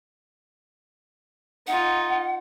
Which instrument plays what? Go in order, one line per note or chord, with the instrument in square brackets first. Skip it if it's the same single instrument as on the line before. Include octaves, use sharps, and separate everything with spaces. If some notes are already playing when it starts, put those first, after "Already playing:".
[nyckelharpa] D#4 F4 [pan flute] F#5